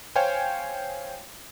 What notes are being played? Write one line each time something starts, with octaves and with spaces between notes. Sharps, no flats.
C5 C#5 F5 G5 G#5